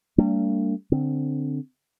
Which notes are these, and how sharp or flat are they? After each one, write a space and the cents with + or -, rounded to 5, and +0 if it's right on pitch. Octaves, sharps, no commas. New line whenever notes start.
G3 +0 A#3 -45 D4 -20
D3 +0 C4 +0